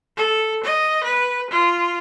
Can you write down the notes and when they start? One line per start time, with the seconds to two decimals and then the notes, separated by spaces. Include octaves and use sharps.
0.17 A4
0.64 D#5
1.04 B4
1.50 F4